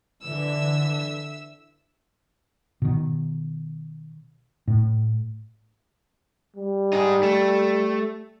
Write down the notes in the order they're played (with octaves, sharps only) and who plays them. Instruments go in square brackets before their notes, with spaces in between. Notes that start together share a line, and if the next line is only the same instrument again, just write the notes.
[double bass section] D3 E3 [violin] E5 E6
[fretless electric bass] B2 D#3
A2
[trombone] G3
[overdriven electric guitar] D#4 G#4
A3